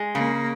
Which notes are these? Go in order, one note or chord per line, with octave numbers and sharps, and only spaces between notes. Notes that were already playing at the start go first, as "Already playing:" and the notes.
Already playing: G#3
C#3 A#3